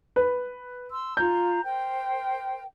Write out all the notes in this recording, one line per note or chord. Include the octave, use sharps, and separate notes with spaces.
B4
C6 E6
F4 A#5 G6
A#4 C5 G5